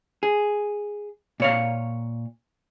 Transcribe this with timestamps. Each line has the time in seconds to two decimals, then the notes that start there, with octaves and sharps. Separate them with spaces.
0.23 G#4
1.40 A#2 C#5 F5